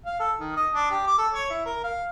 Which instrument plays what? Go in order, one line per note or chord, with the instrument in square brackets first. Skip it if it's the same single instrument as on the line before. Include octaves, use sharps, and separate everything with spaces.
[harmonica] F5
A4
D#3
D#5
D4
G4
D6
A4
C#5
E4
A#4
F5